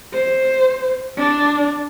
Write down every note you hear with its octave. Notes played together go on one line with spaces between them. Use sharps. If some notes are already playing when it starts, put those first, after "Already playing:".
C5
D4